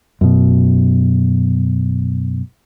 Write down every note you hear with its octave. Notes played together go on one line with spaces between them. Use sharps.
F#2 B2